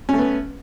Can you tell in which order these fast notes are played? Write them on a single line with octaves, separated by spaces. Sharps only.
C#4 A3 B3